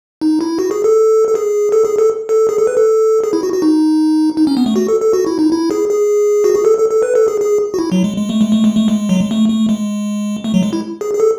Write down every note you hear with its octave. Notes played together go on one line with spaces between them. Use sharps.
D#4
E4
F#4
G#4
A4
A4
G#4
A4
G#4
A4
A4
G#4
A4
B4
A4
G#4
E4
F#4
F#4
D#4
D#4
C#4
B3
A3
F#4
A4
A4
F#4
E4
D#4
E4
G#4
G#4
F#4
G#4
A4
A4
A4
B4
A4
G#4
G#4
F#4
E4
F#3
G#3
G#3
A3
G#3
A3
G#3
A3
G#3
F#3
G#3
A3
A3
G#3
A3
F#3
G#3
E4
G#4
G#4
A4